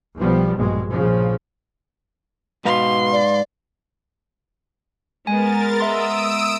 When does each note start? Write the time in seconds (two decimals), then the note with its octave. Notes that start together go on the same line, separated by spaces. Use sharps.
0.17 B1 F3 G3 B3
0.56 A#1 G2 B2 G#3
0.92 A#1 C#3 F3
2.65 G#2 B2 B4 F5 C6
3.12 D5
5.27 G#3 B3 A#4 G#5 A6
5.80 E5 A#5 C6 D#6 E6 D7